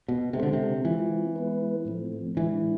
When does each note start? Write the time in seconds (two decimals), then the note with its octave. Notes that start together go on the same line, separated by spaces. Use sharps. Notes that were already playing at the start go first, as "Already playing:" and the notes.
0.08 B2
0.33 C3 G#3 D4 A4 C5
0.43 D3
0.53 C3
0.84 E3 G#3 C4 F4
1.35 G#3 B3 E4 B4
1.85 A2 F3 A3 C4
2.36 A2 E3 G#3 D4